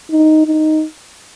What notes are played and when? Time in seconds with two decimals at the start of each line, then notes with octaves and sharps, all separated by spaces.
0.11 D#4
0.46 D#4